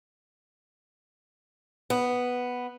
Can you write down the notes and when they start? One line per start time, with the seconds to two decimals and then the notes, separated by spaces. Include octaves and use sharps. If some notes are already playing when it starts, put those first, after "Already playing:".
1.90 B3